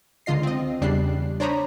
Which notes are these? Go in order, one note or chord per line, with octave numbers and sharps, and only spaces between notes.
C#2 D3 F4 D#5 C7
C4 D#5
E2 C#3 G3 D4 F#6 C7
D4 C5 C#5 A#5 B5 D#6